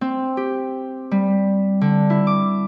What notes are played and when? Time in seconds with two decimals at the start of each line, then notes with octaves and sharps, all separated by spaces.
0.01 C4
0.37 G4
1.11 G3
1.81 D3
2.10 E4
2.27 D6